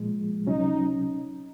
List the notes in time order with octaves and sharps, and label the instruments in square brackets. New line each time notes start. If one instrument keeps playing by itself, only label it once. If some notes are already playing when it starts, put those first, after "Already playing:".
Already playing: [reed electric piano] A#2 F3 G#3
[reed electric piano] C#2 C3 F#3 C#4 [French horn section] D#4